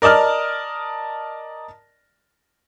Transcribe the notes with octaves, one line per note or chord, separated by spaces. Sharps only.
A#4 D5 D#5 A5 F6